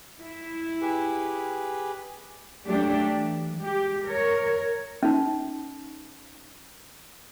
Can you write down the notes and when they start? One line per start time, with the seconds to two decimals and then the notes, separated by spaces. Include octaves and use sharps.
0.22 E4
0.82 G4 G#4 B4
2.67 F#3 A3 D4 G4
3.11 E3
3.59 G#3 G4
4.07 A#4 C#5
5.03 C#4 D#4